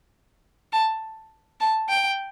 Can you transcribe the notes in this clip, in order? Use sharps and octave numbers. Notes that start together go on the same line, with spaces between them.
A5
A5
G5